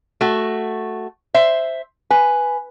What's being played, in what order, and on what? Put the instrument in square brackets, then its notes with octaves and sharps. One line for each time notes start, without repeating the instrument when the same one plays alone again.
[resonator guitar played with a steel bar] A3 F#4
C5 E5
[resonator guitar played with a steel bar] B4 [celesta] G#5